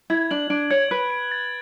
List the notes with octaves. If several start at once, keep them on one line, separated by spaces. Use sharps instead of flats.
E4 G#6
D4 F#7
D4 D7
C#5 G#6
B4 F#6
D7
A6